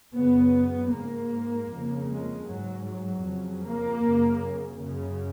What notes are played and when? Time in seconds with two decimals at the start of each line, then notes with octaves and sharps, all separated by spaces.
0.14 F#2 C#3 B3
0.92 G#2 A#3
1.69 F2 C#3
2.09 G#3
2.47 G#2 F#3
2.86 F#3
3.26 F2 C#3
3.64 A#3
4.03 F#2 C#3
4.82 F#2 C#3